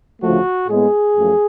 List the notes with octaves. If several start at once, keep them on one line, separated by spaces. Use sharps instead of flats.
D2 C#3 F3 A3 F#4
A2 G#3 B3 G#4
F#2 F3 A3